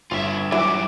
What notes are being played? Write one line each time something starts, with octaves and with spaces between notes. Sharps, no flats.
G1 F4 E5
E3 F#3 G3 D6